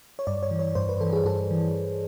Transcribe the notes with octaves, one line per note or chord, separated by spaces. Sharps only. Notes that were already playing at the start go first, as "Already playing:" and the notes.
C#5
G2 D5
C#5
E3
C#5
G2 C5
B4
E3 A4
G#4
G2 A4
E3